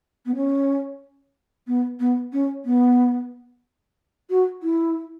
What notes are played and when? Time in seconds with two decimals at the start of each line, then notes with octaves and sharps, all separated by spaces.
0.26 B3
0.36 C#4
1.67 B3
2.00 B3
2.33 C#4
2.65 B3
4.30 F#4
4.63 E4